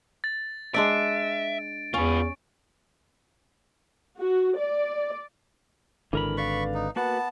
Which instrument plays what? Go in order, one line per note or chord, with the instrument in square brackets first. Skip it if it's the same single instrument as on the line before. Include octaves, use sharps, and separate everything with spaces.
[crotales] A6
[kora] G#3 D4 D5 [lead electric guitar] E5 [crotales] D7
[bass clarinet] E2 [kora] C#4 [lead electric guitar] F4 B4
[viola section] F#4
D5
[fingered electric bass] G#1 D3 [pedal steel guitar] E3 A#4 B5
[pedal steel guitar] B4 D5 F5 [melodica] B5 C#6
[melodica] D#4
[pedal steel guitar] A#3 F#4 B4 [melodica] B3 A5